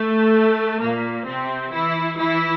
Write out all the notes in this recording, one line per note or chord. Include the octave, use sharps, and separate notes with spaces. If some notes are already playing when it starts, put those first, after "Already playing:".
Already playing: A3
A#2 A#3
C3 C4
E3 E4
E3 E4